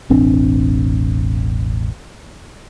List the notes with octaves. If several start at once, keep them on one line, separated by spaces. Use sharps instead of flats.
E1 A1 C4 D4